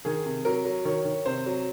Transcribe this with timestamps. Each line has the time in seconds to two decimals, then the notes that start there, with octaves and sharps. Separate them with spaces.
0.05 D#3 G#4
0.26 C3
0.45 F#3 A#4
0.65 F#3
0.85 D#3 C#5
1.05 D#3
1.26 C3 C5
1.46 F#3